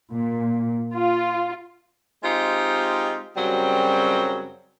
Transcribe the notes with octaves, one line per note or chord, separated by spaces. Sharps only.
A#2
F4
G#3 C4 D#4 F4 G4
F#2 C#3 F#3 G3 C4